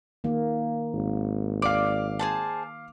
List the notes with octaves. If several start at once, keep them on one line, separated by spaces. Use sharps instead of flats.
D#3 A#3
G#1
D5 F5 D6
G#4 C5 A5